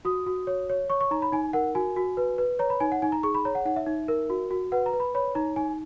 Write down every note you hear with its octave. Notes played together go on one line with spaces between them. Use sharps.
F#4 D#6
F#4
C#5
C#5
C#5 C#6
C#6
D#4 A#5
B5
D#4 G#5
A#4 F#5
F#4 G#5
F#4
B4
B4
C#5 A#5
B5
D#4 G#5
F#5
D#4 G#5
A#5
G#4 C#6
B5
C#5 A#5
F#5
D#4 F#5
E5
D#4
A#4
F#4
F#4
B4 F#5
A#5
B4
B5
C#5 B5
D#4 A#5
D#4 G#5